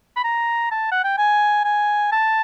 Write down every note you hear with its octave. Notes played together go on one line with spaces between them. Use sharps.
B5
A#5
A5
F#5
G5
G#5
G#5
A5